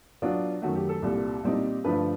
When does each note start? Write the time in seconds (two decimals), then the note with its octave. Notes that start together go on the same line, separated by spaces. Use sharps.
0.22 B2 F#3 B3 D4 F4
0.62 F#2 D#3 F#3 A3 F#4
0.75 G4
0.89 A4
1.02 C2 A#2 G3
1.43 A#2 G3 C4 D#4
1.84 G2 D3 F3 A3 B4